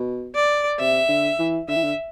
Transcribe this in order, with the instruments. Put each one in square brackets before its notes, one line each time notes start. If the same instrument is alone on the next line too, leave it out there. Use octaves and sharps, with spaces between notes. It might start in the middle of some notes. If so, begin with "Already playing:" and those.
Already playing: [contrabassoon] B2
[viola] D5
[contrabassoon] C3 [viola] E5
[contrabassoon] D3
E3
[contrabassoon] D3 [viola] E5
[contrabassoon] E3
D3